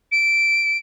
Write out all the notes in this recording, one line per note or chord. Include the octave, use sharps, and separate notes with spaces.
D7